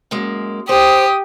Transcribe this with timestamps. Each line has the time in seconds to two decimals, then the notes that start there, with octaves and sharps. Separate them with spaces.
0.11 F#2 G#3 A#3
0.69 G4 C5 D#6